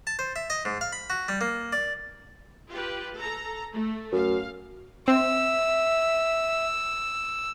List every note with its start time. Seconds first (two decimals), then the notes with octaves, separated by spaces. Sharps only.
0.07 A5
0.19 C5
0.36 E5
0.50 D#5
0.65 G#2
0.81 F5
0.92 B5
1.10 F#4
1.28 G3
1.41 A#3
1.73 D5
2.69 F4 G4 B4
3.17 A4 A#5
3.72 A3
4.12 F#2 F5
5.08 C4 E5 E6